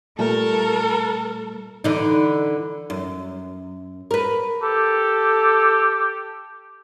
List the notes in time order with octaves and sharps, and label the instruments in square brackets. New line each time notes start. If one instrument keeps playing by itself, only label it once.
[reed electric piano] A#2 G3 A3 [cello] A4 [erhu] A#4
[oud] D3 E3 D#4
F#2
A#4 B4
[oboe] G4 [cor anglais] A4